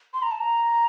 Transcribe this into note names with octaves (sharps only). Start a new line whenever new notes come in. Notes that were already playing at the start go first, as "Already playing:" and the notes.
C6
A#5
A5
A#5